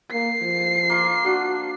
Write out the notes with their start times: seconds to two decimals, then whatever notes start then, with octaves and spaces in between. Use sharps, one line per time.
0.12 A#3 C7
0.42 F3
0.90 A#3 F4
1.25 F3 D4 F#4